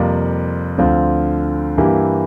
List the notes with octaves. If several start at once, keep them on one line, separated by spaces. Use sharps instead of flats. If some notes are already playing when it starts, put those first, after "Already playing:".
Already playing: F2 C3 G3 A#3 F4
D2 D3 F3 C4 F4
G2 E3 A#3 E4 G4